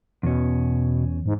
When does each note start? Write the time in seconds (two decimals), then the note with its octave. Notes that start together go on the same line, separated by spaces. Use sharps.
0.23 E2 B2 C#4
1.26 G#2